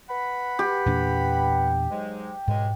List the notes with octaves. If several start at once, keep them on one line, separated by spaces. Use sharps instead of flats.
B4 F#5 B5
G4
E2 A#2 D4
G#2 F#3 G#3
C#2 G#2 B2 G#3